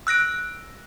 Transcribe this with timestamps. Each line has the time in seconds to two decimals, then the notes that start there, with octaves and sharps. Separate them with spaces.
0.07 E6 F#6 A#6 D7